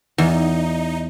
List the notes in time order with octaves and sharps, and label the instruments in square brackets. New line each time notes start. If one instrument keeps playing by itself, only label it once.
[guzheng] E2 [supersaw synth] D#4